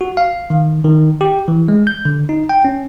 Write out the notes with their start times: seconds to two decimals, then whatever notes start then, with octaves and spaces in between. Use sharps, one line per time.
0.01 F#4
0.17 F5
0.50 D#3
0.84 D#3
1.21 G4
1.48 E3
1.68 G#3
1.87 G6
2.05 D3
2.29 D#4
2.49 G5
2.65 C#4